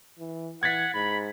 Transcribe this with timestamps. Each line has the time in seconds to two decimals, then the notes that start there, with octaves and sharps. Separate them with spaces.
0.19 E3
0.63 E3 F#5 G#6 A6 B6
0.94 G#2 B5